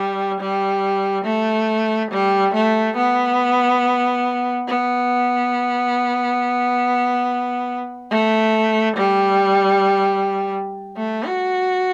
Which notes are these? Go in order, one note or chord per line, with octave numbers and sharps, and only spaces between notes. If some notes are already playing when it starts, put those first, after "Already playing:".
Already playing: G3
G3
A3
G3
A3
B3
B3
A3
G3
A3
F#4